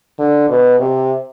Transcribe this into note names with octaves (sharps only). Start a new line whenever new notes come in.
D3
B2
C3